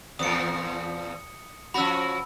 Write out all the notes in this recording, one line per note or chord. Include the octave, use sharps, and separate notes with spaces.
E2 A#2 F3 D#6 C#7
F3 C#4 F#4 B5 E6